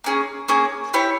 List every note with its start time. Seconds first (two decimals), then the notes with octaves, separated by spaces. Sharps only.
0.04 A#3 C#4 G#4
0.48 A#3 C#4 G#4
0.94 E4 G4 C#5